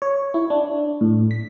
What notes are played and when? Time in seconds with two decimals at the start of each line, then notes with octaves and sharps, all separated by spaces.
0.02 C#5
0.34 E4
0.50 D4
1.01 A2
1.31 B6